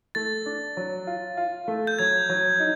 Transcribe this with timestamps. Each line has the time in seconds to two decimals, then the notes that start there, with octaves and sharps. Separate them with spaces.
0.15 A3 A6
0.46 D4
0.77 F#3
1.07 F4
1.37 F4
1.68 A3
1.87 G6
1.99 F#3 G#6
2.29 F#3
2.60 D#4